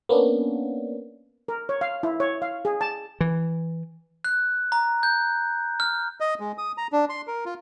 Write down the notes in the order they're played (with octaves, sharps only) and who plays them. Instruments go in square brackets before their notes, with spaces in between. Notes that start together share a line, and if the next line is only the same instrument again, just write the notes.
[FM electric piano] A#3 B3 C#4 D4
[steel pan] A#4
C#5
F5
E4
C#5
F5
G#4
A5
[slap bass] E3
[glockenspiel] F#6
A#5
G6
F6
[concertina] D#5
G#3
D#6
A#5
D4
C6
A#4
F4